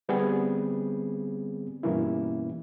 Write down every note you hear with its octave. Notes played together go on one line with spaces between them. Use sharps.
D3 G3 B3 C4 G#4
G2 B2 E3 A#3 C#4 E4